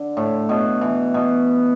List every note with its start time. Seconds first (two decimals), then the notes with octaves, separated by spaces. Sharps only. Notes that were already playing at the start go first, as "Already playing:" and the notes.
Already playing: D3
0.17 A2
0.49 B2
0.81 E3
1.14 B2